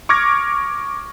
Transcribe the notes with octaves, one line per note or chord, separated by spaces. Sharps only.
C#6 D6 F6 G#6 A#6